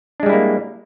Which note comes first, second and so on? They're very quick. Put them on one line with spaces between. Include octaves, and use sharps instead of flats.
D4 G#3 G3 E4 A#3